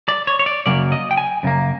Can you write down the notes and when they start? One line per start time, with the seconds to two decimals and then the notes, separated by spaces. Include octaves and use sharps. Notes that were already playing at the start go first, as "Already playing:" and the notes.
0.08 D5
0.27 C#5
0.39 C#5
0.46 D5
0.66 F#2 C#3 F#3 A#3 D5
0.92 D#5
1.11 G5
1.17 G#5
1.43 F#2 C#3 A#3